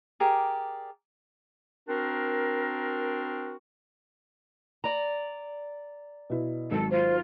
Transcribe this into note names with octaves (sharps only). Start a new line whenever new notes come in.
G4 G#4 A#4 D5
C4 D4 F#4 A#4
D5 A#5
B2 E4
G#1 F#3 A4
F4 C5